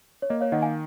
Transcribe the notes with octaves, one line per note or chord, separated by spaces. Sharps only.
C#5
A#3 D#5
C#5 F5
D#3 D#5 F#5
F5 G#5